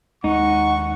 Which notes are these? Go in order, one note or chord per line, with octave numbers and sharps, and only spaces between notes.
D#2 G#3 D#4 F#5 C#6